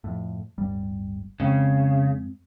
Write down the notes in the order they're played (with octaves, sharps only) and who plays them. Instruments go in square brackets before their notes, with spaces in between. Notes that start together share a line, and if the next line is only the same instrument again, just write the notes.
[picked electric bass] F2 A2
D1 G1 G3
[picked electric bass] F2 G#3 C4 [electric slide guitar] C#3